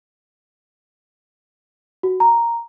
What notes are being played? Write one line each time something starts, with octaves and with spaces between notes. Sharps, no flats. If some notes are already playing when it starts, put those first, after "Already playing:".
F#4
A#5